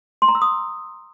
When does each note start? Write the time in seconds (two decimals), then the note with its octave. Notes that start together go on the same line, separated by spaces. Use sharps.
0.22 C6
0.28 A#5
0.35 E6
0.42 D#6